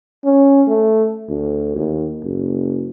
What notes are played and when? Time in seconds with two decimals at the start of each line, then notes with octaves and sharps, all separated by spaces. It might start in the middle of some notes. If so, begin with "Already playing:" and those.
0.25 C#4
0.68 A3
1.29 D2
1.76 D#2
2.23 F#1